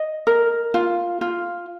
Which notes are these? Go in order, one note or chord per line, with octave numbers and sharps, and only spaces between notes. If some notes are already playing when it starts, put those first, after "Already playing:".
Already playing: D#5
A#4
F4
F4